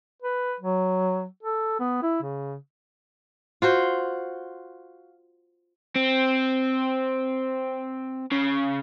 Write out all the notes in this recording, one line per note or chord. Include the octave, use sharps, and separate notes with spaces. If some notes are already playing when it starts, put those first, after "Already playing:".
B4
F#3
A4
B3
E4
C#3
F4 F#4 C5
C4
C#3